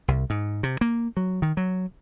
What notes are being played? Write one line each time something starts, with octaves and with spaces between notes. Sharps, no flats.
C2
G#2
C3
A#3
F#3
D#3
F#3